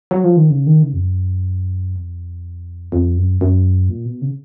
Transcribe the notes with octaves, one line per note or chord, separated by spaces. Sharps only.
F#3
F3
D#3
C#3
D#3
C#3
F2
F#2
F2
F2
F#2
F#2
A#2
B2
C#3